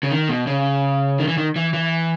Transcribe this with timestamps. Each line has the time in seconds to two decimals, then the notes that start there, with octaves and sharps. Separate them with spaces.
0.03 C#3
0.11 D#3
0.29 B2
0.47 C#3
1.19 D#3
1.28 E3
1.38 D#3
1.56 E3
1.74 E3